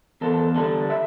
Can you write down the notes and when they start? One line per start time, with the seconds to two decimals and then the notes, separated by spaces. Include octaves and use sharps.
0.21 E2 A4
0.56 D3 G3 A4
0.90 E5